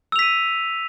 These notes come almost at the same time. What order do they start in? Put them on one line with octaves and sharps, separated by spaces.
E6 F7 B6 D#7